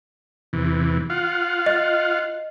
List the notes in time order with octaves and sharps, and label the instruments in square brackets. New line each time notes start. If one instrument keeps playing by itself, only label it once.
[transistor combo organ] E2 C3 E3
F4 F5 F#5
[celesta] D#5